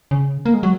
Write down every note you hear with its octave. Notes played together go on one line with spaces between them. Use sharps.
C#3
A#3
G#3
F#3